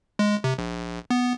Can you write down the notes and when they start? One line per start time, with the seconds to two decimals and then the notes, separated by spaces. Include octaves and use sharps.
0.19 G#3
0.44 C3
0.59 A#1
1.10 B3